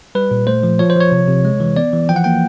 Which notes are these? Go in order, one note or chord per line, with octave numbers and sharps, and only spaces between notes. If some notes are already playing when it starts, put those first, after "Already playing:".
G3 B4
A#2
A3 C5
F3
F3 C#5
C5
F3 C#5
C3
C3
G#3
E3
B3 D5
E3
F3 G5
F#5
A#3 G5